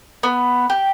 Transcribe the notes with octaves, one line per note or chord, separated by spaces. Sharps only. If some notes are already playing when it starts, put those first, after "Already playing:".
B3
G4